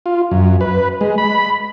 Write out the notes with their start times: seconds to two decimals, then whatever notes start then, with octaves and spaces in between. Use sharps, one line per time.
0.06 F4
0.31 F#2
0.61 B4
1.01 G#3
1.18 B5